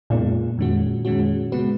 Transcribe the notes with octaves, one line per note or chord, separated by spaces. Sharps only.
F2 A#2 C#3 G#3 B3 D#4
F2 D#3 G#3 C#4 F#4
F2 D#3 G#3 C#4 F#4
C#3 G#3 B3 F#4 B4